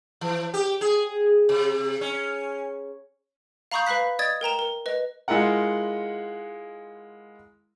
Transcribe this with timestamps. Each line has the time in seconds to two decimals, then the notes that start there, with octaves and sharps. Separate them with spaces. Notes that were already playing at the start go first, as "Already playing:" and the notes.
0.21 E3
0.54 G4
0.81 G#4
1.49 C3
2.01 C#4
3.72 F5 A#5 B5 C#6 D#6 G6
3.87 B4 F5 B5 F#6 B6
4.19 D5 D#5 D#6 G#6 A6
4.41 A#4 G5 A#5 E7
4.59 A#4
4.86 B4 D#5
5.28 G#3 E4 F4 A#4 F#5